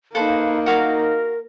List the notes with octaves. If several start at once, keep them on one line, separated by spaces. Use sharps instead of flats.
A#3 D#4 A4 B4 C5 F5
F#4 A#4 F5 D6